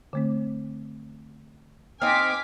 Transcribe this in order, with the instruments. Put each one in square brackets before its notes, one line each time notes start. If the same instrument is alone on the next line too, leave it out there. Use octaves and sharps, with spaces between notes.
[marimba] D3 A3 C4
[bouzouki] C4 D#4 [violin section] G#5 D6 B6 [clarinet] F6